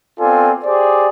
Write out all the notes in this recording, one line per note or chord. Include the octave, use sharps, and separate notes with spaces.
B3 C4 F4 A4 D5 G#5
G4 G#4 C5 D5